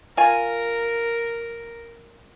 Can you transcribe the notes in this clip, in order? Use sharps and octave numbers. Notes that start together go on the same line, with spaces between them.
F4 A#4 G#5